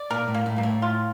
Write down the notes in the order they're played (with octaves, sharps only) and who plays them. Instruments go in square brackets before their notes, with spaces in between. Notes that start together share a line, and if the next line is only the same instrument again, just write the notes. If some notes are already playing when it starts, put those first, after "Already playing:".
Already playing: [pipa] D5
[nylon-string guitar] A#2 [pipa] A#4
[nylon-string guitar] A2
[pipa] A#3
[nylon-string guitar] A2
[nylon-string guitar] G2 [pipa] A#3
[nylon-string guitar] A2
[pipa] F4